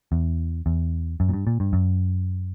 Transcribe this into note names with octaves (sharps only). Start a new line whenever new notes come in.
E2
E2
F#2
A#2
G2
A#2
G2
F#2